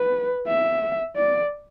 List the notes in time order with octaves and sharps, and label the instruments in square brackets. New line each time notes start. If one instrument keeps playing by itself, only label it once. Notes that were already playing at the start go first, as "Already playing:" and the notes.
Already playing: [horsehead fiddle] B4
E5
D5